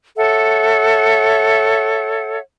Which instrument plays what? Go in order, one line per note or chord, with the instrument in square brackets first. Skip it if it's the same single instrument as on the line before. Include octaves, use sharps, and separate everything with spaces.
[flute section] A4 C#5 E5 F#5